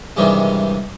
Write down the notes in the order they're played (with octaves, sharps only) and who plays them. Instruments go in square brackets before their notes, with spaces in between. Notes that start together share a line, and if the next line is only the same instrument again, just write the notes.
[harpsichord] G2 C3 D#3 E3 G3 G#3